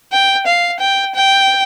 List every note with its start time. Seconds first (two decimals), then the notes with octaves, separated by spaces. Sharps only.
0.12 G5
0.46 F5
0.80 G5
1.15 G5